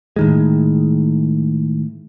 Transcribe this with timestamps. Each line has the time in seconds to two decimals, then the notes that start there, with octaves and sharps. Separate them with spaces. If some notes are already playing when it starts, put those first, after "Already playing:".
0.16 A2 D#3 G#3